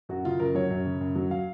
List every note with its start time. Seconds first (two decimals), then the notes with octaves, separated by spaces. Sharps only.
0.09 F#2 F#4
0.25 C#3 F4
0.40 F#2 A#4
0.55 F#3 C#5
0.71 F#2
0.86 C#3
1.01 F#2
1.16 F#3
1.31 F5